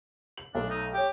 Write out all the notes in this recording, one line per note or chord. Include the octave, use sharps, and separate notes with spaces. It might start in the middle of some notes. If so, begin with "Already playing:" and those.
F#7
B1 A3 D4
D#4
G4 C#5 G5